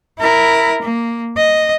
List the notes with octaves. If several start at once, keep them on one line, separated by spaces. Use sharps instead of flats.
E4 A#4
A#3
D#5